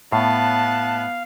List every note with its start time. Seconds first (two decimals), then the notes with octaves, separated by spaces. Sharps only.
0.12 A2 B3 F5 A5 F#6